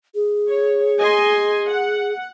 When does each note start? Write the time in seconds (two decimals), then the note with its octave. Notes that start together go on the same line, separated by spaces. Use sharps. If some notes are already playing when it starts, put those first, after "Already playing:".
0.15 G#4
0.49 C#5
1.00 D#5 G#5 C6
1.68 F#5